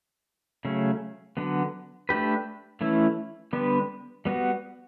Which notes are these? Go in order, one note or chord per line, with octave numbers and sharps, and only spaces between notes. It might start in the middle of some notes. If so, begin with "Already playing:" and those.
C#3 F#3 A3 C#4
D3 F#3 B3
A3 D4 G4 B4
E3 A3 C#4 E4
D3 G3 B3 D4
G3 B3 F#4